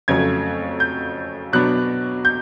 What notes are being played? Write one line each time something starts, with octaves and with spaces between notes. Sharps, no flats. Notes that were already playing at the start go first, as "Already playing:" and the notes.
F2 C#3 F#3 A3 G#6
G6
B2 F#3 B3 D4 F#6
G6